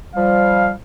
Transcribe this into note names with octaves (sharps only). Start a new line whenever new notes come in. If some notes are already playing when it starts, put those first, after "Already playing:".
F3 G3 F5